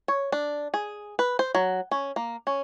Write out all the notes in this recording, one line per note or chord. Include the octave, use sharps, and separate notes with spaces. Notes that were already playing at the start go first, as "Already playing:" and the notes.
C#5
D4
G#4
B4
C5
F#3
C#4
A#3
C#4